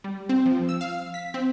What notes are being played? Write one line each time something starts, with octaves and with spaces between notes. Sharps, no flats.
G3
C4
F3
E6
F5
B6
C4